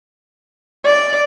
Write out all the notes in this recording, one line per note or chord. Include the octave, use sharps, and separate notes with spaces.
D5